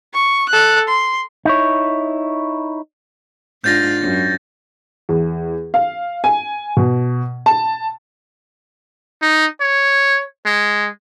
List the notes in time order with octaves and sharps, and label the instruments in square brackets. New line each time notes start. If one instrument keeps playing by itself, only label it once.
[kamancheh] C#6
A4 F#6
C6
[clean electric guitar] D#4 E4 C#5
[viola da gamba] G#2 D4 F4 [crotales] G6 A6 A#6
[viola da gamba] F#2
[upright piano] E2
F5
G#5
B2
A5
[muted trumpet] D#4
C#5
G#3